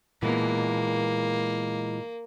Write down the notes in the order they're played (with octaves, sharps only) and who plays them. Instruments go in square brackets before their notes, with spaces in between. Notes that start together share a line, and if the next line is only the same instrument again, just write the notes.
[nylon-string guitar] A#2 B3 [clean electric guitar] E3 G#3 [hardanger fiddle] A#3